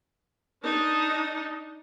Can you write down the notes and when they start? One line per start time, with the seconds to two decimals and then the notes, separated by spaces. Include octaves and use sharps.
0.63 D4 D#4